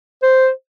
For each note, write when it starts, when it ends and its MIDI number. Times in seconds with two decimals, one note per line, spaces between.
0.23 0.50 72